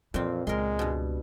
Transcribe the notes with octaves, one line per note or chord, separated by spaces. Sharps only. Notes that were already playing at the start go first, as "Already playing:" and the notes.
F2 A#2 E3 C4
C#2 G#3 A#4 C6
G2 B2